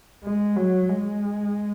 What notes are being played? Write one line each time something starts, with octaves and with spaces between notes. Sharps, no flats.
G#3
F#3
G#3